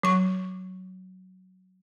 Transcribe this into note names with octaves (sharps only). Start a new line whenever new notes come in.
F#3 C#6